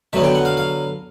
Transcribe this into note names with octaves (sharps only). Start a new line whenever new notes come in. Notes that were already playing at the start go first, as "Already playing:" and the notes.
D3 F#3 B3 E5
G5
F#5
F5
F5